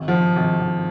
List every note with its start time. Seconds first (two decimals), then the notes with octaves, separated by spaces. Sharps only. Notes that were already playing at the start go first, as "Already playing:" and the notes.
Already playing: G#1
0.08 G2 F3
0.36 G#1
0.60 G#1